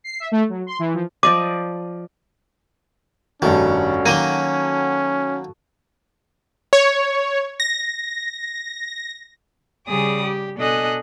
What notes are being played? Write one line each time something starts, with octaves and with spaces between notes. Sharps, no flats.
C7
E5
A3
F#3
C6
E3
F3
F3 D5 D#5 D6
F1 G2 D#3 C#4 F#4 A4
D#3 F#3 A#3 D#7 G7
C#5
A#6
C#3 G3 G#4 D5 D#6
G4
B2 D4 A4 D#5 G#5 F#6